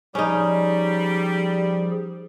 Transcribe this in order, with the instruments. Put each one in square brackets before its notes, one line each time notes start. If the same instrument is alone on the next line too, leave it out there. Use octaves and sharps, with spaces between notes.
[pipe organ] F3 G#4 [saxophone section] G3 [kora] C#4 D#4